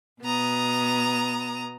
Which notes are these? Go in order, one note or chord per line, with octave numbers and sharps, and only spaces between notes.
B2 B3 A#5 D#6